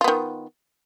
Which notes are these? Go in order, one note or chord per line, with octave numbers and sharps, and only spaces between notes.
D#3 B3 F4